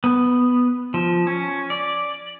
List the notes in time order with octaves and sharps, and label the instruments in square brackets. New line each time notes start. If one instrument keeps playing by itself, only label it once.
[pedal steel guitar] B3
F3
C#4
D5